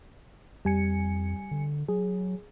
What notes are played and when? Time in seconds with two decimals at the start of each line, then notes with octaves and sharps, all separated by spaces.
0.65 F2 G3 G#5 C#7
1.51 D3
1.88 F#3 G#4